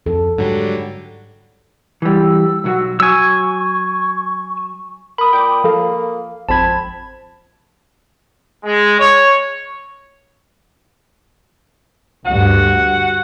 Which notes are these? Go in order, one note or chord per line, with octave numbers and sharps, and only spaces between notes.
F2 A4
G#2 D3 F#3 G3
E3 G3 E6
B1 F#3 F#4
F#3 G#5 C#6 E6
A#4 B5 D#6
A#2 G5 D6
F3 A#3 A4 F5
G#1 F2 C4 A5 B5 G#6
G#3
C#5
D2 G2 F#4 F#5